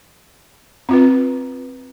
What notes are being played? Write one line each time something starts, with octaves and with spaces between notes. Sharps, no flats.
C4 F4 B4